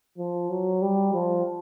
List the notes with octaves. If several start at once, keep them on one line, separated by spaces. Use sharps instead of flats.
F3
F#3
G3
F3